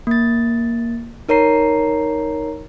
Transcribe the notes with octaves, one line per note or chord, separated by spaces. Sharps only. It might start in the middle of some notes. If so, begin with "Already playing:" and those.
A#3 A6
D#4 A#4 C#5 A#5 C7